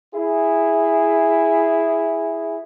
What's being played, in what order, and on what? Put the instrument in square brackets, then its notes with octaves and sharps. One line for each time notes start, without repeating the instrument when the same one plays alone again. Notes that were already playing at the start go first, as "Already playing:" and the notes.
[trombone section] E4 G#4